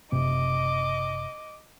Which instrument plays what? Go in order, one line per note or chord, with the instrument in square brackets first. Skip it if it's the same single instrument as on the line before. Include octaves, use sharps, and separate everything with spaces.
[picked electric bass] F#1 C3 C4 [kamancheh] D#5 D6